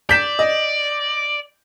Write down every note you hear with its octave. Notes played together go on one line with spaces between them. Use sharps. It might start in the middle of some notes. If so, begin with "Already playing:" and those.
D5 G6 B6 E7
D#5